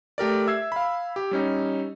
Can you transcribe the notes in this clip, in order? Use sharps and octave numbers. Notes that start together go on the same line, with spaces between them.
A3 G4 A#4 D5
E5 E6 G#6 C7
F5 B5
G4
G3 C#4 D#4